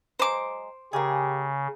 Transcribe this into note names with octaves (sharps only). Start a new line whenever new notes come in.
F#3 G#3 C5 D6
C#3 A#3 G4 G#4